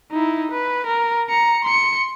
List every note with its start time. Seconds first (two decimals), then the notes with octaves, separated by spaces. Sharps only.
0.11 D#4 E4
0.52 B4
0.87 A#4
1.29 A#5 C#7
1.65 C6 C#7